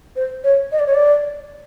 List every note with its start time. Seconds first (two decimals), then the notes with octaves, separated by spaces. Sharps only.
0.16 C5
0.44 C#5
0.72 D#5
0.79 D5
0.86 C#5
0.94 D5